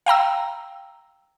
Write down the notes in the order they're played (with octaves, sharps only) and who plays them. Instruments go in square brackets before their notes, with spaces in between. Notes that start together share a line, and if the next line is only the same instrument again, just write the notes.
[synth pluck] F5 G5 A#5 E6